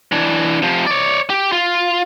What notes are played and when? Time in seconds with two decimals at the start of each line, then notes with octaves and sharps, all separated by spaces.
0.12 E3 D4
0.62 C3 F3
0.87 C#5 D5
1.30 G4
1.52 F4